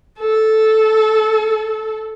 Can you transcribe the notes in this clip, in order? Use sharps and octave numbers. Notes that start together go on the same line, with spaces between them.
A4